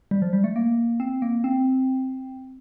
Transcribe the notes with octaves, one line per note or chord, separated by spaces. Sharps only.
G3
F3
G3
A3
A#3
C4
A#3
C4